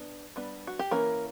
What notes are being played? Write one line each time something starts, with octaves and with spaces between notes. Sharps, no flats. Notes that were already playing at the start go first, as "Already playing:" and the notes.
Already playing: B3 D4
G3 B3 D4
F#4
G4
E3 A#3 C#4 A#4